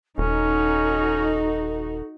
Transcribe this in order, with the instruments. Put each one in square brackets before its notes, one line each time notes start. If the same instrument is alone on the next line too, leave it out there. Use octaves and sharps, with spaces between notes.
[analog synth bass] D#1 [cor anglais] C#4 [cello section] D#4 F#4 [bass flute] A4